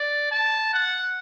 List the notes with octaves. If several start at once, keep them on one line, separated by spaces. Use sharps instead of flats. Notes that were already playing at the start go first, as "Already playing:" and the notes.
Already playing: D5
A5
F#5